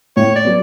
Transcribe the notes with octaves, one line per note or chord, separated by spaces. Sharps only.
A2 C#5
D5
F#3 B3